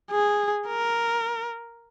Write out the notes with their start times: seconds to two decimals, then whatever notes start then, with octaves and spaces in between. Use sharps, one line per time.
0.11 G#4
0.68 A#4